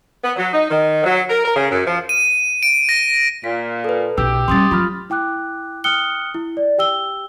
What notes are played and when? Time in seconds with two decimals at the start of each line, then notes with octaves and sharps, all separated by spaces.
0.22 B3
0.36 F#3
0.52 D#4
0.70 D#3
1.04 F#3
1.29 A#4
1.43 A#4
1.55 C#3
1.71 F#2
1.86 F3
2.09 D#7
2.63 D7
2.89 A#6
3.44 A#2 B6
3.84 A4 B4
4.18 B1 B2 G4 E6
4.48 G3 C#4 C6 D#6 A6
4.71 F3 F#3 F4 B5 F6
5.10 E4 G5 D6 F#6
5.84 G5 D#6 F6 F#6 C#7 G7
6.34 E4
6.57 D5
6.78 G4 G5 E6 G7